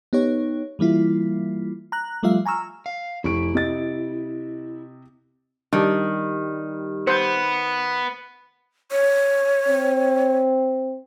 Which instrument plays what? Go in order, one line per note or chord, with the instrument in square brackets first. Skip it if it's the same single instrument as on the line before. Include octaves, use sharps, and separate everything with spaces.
[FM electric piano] B3 D#4 G4 C#5
E3 G3 A#3 E4 F4
A#5 F#6
F3 G3 A3 F4 E5 F5
G#5 A#5 C#6 E6 F6
[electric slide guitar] F5
[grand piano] F1 C#6 D7 [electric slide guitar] E4
[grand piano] C3 D#5 A6
[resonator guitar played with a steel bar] D#3 [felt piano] G3 [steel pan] D4
[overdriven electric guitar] B3 [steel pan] C5
[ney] C#5
[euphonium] C4